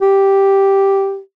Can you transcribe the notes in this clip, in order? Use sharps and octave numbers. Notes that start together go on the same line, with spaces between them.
G4